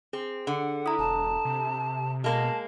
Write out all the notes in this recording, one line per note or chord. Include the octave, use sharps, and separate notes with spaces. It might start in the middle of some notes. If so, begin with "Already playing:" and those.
C4 G#4
D3 F#5
E4 A#5 D#6
E1 A5
C3
B2 G#3 A#3 A5